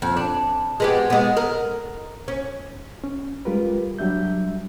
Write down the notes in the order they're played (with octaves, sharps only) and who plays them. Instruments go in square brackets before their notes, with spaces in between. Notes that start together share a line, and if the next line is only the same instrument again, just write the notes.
[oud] F2
D4
G#3 B3 G4
G#3 B3
A#4
C#4
[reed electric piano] C#4
G3 G#3 F4 G4 A#4 B4
F#3 G3 D4 E5 G6